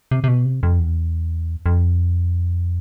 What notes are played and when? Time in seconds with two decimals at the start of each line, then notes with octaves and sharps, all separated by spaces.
0.11 C3
0.24 C3
0.28 B2
0.45 C3
0.63 F2
0.79 E2
1.66 F2